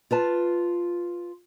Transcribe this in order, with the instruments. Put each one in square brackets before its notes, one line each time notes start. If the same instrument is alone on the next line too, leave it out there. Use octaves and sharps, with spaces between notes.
[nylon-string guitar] F4 B4 A5